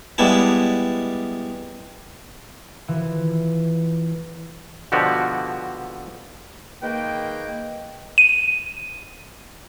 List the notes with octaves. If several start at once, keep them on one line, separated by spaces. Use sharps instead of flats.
G3 G#3 B3 E4 A5
E3 F3
B2 D3 F3 F#4 G4
D#3 G#3 A#3 B4 G5
D#7